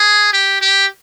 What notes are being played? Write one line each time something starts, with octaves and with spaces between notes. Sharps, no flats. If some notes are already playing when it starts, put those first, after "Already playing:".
Already playing: G#4
G4
G4